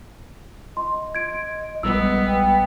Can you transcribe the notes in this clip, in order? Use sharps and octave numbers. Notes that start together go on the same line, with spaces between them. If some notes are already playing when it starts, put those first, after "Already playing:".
D#5 C6
G#6 D7
A#1 G3 G#3 B3 D#5 E6
G5